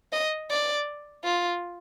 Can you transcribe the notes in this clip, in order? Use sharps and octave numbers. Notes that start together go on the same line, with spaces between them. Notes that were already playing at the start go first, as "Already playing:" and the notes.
D#5
D5
F4